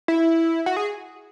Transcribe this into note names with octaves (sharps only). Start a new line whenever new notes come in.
E4
F#4
G#4